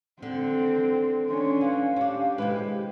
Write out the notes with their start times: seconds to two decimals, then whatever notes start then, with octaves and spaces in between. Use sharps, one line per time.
0.22 D3 C4
1.28 C#4 D4 C6
1.61 E3 F5
1.96 C#4 D4 G4
2.38 C3 G#3 E4 B4